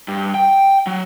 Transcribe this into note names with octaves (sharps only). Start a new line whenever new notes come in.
G2
G5
F#3